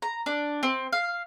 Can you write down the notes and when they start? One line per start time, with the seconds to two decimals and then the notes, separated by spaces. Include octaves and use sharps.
0.02 A#5
0.26 D4
0.63 C4
0.93 F5